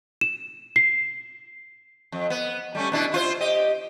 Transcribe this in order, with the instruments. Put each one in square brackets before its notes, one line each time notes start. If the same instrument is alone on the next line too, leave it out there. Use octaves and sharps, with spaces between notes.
[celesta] E7
C7
[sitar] F2
B3
G3 A3 C#4
B2 D4 E4
E4 F4 C5
G4 D#5